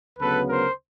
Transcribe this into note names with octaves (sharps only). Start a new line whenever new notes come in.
D2 C#3 F#3 B3 A4 B4
A#4 C5